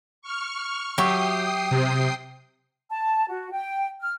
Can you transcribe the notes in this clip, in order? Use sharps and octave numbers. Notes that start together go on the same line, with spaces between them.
C#6 F6
F#3 G4 E5 G5 C#6 D#6 C7
C3
A5
F#4
G5
F6